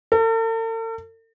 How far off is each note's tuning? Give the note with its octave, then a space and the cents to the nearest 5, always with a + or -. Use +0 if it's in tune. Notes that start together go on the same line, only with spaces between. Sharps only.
A4 +45